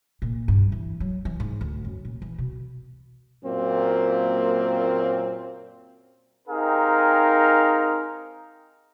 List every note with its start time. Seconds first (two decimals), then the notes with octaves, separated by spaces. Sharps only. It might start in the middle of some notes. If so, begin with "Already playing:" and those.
0.22 A#2
0.48 G2
0.72 E3
1.00 F#3
1.25 E3
1.40 G#2
1.61 D2
1.85 F#2
2.05 A#2
2.22 E3
2.38 B2
3.45 F#2 A#2 A#3 C4
6.48 C4 D#4 G4 G#4 A#4 F5